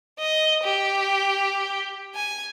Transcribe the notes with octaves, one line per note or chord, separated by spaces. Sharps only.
D#5
G4
G#5